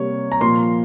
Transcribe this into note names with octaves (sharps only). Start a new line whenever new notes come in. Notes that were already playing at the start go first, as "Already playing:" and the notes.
Already playing: C3 G3 A#3 C#5
A#5
A#2 F3 A#3 C6